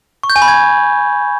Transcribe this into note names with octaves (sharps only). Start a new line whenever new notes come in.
C#6
G6
G#5
B5
G#6